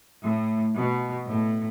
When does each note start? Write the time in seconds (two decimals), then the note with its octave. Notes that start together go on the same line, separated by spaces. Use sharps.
0.24 A2
0.76 B2
1.28 A2